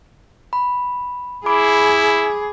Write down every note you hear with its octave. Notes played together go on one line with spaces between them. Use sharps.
B5
E4 G#4 B5 D6 D7